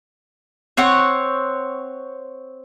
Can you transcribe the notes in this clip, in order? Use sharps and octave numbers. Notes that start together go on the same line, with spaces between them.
C4 C#5 F#5